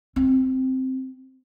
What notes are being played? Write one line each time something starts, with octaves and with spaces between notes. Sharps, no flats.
C4